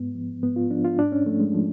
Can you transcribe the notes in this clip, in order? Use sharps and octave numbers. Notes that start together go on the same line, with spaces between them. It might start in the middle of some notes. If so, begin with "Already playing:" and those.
Already playing: G#2 B3
F3
G#2 B3
F4
F3 D4
F4
G#2 D4
C#4
F3 A3
G#3
F3